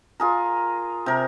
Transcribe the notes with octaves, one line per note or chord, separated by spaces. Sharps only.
F4 G#4 A#4
C3 A#4